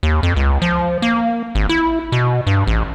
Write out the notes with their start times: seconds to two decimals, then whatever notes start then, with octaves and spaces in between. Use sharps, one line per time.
0.03 D#2
0.23 F2
0.36 C#2
0.62 F3
1.02 A#3
1.55 G#1
1.69 E4
2.12 B2
2.47 G2
2.67 A1